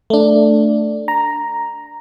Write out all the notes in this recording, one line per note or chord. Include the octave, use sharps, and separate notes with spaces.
A3 D4
A#5